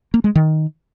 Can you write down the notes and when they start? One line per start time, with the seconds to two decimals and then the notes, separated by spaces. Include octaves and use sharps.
0.14 A#3
0.24 G#3
0.35 D#3